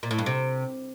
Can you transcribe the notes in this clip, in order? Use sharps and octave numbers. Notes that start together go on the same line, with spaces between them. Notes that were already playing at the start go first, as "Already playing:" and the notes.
A#2
A2
G2
C3